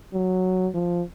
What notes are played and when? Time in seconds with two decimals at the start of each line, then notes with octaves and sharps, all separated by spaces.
0.13 F#3
0.74 F3